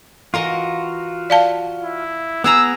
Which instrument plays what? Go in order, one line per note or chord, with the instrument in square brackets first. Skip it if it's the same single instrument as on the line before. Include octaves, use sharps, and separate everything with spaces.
[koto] E3 A#4 D#5 [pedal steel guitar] F4 F#4
[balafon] D5 F5 A5
[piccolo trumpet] E4
[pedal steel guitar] B3 [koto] E4 G#4 A#5 [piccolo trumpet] E6